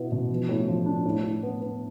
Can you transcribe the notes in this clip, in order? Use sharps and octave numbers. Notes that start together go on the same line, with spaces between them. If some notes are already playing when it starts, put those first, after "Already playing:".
Already playing: B2 B3 E4
B2
F3
A2
F3
D4
A2
A2
B3
B3